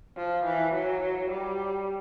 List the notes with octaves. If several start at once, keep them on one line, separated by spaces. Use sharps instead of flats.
F3
E3
F#3
G3